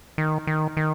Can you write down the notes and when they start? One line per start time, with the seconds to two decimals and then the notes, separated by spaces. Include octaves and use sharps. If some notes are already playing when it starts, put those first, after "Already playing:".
0.18 D#3
0.47 D#3
0.77 D#3